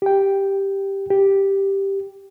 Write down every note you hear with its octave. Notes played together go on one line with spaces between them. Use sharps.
G4 G5
G4